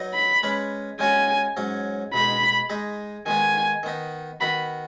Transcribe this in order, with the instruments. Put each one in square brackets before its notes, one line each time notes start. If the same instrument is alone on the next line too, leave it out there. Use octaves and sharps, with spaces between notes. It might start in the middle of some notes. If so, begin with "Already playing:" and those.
Already playing: [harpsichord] F#3 D#4 B4 D#5
[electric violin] B5
[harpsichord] G#3 C#4 B4
[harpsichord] G#3 C#4 F#4 C#5 [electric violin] G#5
[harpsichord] G#2 F#3 C#4
[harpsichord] B2 G#3 D#4 [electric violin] B5
[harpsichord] G#3 D#4 G#4
[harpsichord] D#3 G#3 B3 [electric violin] G#5
[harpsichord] D#3 B3 D#4
[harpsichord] D#3 B3 F#4 [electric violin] B5